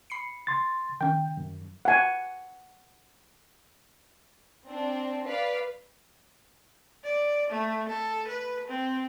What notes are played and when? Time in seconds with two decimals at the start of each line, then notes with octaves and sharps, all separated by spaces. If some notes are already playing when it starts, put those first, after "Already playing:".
0.10 B5 C7 C#7
0.47 C6 A6
1.01 D#3 C#4 G5
1.37 F#2
1.85 F#5 G#5
4.67 C4 D4
5.26 B4 D5 F5
7.04 D5
7.50 A3
7.89 A4
8.28 B4
8.68 C4